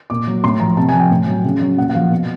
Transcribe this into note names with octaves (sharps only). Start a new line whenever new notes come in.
A#2 D6
F#3
A2 C6
F3 A#5
C3 A5
G#5
F3
G5
A2
F#3
C#3
F#3
A#2 F#5
F#5
F3 F5
B2